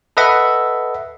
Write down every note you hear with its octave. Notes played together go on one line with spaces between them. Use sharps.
A4 B4 D#5 E5 F#5